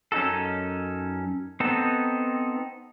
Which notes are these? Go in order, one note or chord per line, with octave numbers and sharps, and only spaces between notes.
F#2 C#4 D#4 F#4 A4
B3 C4 D#4 A4